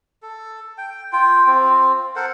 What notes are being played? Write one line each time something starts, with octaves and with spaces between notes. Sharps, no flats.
A4
G5
F4 G5
C4 F4
A4 A#4 C5 F#5